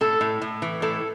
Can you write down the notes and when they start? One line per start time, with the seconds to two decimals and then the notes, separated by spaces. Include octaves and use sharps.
0.01 A2 A4
0.21 A2
0.42 A2
0.62 E3
0.82 A2 A4